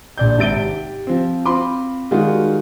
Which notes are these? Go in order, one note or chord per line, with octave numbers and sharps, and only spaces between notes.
A#1 D5 G6
G#1 C3 E5 A6 D7 G7
G4
F3 C4
C4 F4 B5 C6 D6
D#3 G3 G#3 F4 F#4